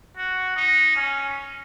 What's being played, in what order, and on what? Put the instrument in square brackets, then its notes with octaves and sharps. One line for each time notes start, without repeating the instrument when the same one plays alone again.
[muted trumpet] F#4
D#4
C#4